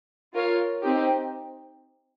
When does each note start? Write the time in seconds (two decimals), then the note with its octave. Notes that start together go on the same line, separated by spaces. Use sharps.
0.34 F4 A#4 C#5 F5
0.82 C4 D#4 G4